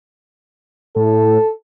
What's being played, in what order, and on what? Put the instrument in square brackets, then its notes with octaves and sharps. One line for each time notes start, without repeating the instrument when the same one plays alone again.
[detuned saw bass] A2 [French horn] A4